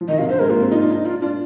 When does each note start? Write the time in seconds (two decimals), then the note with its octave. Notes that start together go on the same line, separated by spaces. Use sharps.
0.01 F3
0.08 D#3 D#5
0.19 C3 F5
0.29 D3 C5
0.39 G#3 A#4
0.50 A#3 F4
0.60 C4
0.71 D#4 F4
0.82 D4
0.92 D#4
1.06 F4
1.20 D4 F4